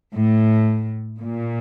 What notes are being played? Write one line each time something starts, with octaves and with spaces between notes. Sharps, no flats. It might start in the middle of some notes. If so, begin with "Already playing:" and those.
A2
A#2